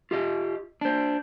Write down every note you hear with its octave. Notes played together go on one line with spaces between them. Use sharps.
F4 G4 D#5
D4 C5